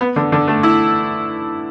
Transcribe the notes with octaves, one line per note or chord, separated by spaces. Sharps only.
B3
D3
D3
A3
E4